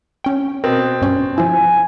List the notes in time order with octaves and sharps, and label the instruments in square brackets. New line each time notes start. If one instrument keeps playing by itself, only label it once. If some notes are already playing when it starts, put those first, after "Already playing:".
[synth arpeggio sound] C#4 G5
[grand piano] B2 C4 [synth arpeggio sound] A#4
[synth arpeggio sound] G2 C#4
[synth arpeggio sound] F3 E4 [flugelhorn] G#5